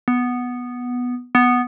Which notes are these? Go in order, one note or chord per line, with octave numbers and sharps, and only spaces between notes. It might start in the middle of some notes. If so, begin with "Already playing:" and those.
B3
B3